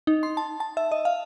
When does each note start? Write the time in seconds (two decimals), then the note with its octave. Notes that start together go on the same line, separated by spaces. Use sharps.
0.07 D#4
0.23 C6
0.37 A5
0.60 A5
0.77 E5
0.92 D#5
1.05 F5